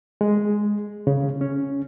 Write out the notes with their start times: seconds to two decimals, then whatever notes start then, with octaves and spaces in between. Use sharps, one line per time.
0.21 G#3
1.07 C#3
1.41 C#4